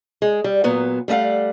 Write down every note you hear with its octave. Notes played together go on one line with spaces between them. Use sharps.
G#3
G3
A#2 F#3 B3
G3 A3 D#5 F5 F#5